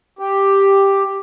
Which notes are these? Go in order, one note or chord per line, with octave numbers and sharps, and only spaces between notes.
G4